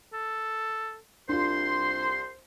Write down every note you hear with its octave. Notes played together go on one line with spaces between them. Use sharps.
A4
C2 D4 F4 C5 C6